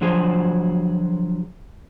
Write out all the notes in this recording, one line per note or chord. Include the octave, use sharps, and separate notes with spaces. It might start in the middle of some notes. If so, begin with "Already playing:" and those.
D3 F3 F#3 F#4 G#4 C5